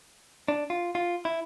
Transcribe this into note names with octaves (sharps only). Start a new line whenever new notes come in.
D4
F4
F4
E4